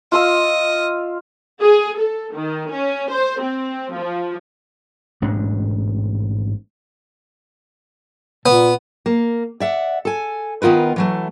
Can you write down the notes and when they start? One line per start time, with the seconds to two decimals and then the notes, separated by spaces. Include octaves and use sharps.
0.12 F4 D#5 F5 E6
1.62 G#4
1.98 A4
2.34 D#3
2.70 C#4
3.11 C5
3.42 C4
3.93 F3
5.22 A1 G#2 B2 D4
8.46 A#2 B3
9.06 A#3
9.60 D5 E5 F#5
10.05 A4 G#5
10.62 D#3 B3 F4 A#4 B4
10.96 E3 F#3 A3